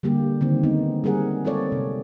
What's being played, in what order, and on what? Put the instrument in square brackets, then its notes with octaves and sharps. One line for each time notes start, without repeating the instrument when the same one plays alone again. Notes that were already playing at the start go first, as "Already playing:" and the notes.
[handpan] D3 G3 A#3 G4
D3 D#3 C4
G#3 B3 D#4
G3 C4 G#4 A#4 F#5
G#3 C4 F4 A4 C#5 D5
C3